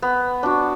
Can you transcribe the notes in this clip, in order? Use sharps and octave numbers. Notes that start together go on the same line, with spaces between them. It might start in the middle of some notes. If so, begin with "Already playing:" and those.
B3
D4 F#4